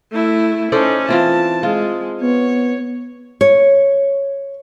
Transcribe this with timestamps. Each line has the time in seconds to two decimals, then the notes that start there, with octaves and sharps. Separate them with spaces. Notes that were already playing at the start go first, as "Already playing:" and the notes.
0.12 A3 E4
0.72 C#4 D#4 A4 C5 D5
1.09 E3 C4 F4 A5
1.63 G#3 F4
2.21 B3 C#5
3.41 C#5